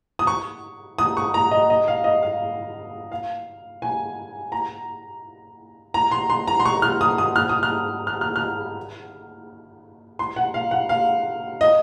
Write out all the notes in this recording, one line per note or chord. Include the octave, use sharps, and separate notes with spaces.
D#6
C#6
D#6
C#6
A#5
D#5
D#5
F5
D#5
F5
F5
G#5
A#5
A#5
C6
C6
A#5
C6
C#6
F6
D#6
D#6
F6
D#6
F6
F6
F6
F6
C6
F#5
F5
F#5
F5
D#5